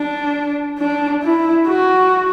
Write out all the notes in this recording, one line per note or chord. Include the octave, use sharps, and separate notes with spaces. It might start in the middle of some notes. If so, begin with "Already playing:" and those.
Already playing: D4
D4
E4
F#4